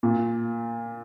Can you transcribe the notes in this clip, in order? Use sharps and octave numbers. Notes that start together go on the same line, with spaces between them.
A#2